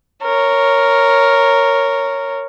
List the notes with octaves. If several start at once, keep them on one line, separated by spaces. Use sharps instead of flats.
A#4 C#5